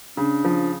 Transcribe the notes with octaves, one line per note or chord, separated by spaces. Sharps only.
C#3 D4
F3